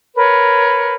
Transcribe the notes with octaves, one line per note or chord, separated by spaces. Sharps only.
A#4 B4 C#5